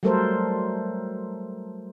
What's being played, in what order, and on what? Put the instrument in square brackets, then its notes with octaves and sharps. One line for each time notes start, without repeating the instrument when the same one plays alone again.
[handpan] F#3 G3 A3 A4 A#4 C5